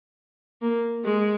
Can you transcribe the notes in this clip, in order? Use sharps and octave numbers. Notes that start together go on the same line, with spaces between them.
A#3
G#3